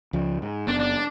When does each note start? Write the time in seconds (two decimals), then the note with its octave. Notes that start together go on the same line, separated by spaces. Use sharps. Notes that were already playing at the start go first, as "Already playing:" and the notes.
0.13 C#2 F3
0.42 G#2
0.68 F#1 B3 D4
0.80 D4